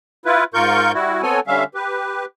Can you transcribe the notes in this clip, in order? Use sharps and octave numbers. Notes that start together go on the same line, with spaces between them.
E4 F4 B4
G#2 F4 A#4 C#6 G6
G3 E4 F#4
B3 C4 A4 C#5 G#5
D3 G3 C#4 E5 F5
G4 B4